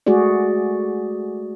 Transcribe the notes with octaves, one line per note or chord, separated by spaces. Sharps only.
G#3 A3 F#4 G#4 D5